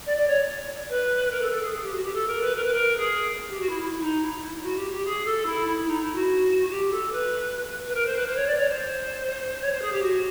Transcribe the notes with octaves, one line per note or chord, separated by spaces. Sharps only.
D5
D5
C#5
B4
A#4
A4
A4
G#4
G#4
G4
F#4
G4
A4
A#4
B4
A#4
B4
A#4
G#4
G4
F#4
E4
E4
E4
D#4
E4
F#4
G4
G4
G#4
A4
E4
E4
D#4
E4
F#4
G4
A4
B4
B4
A#4
C5
B4
C5
C#5
D5
C#5
C5
C#5
C5
G#4
G4
F#4